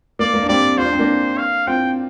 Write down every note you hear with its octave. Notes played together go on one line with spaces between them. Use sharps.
A#3 D5
A#3
D4
G3 C4 D5
F4 C5
D4
C4
A#3 D4
F5
C4 F4 G5